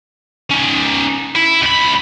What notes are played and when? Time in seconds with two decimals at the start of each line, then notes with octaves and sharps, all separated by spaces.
0.51 C#4 D#4
1.36 E4
1.62 C#2 B5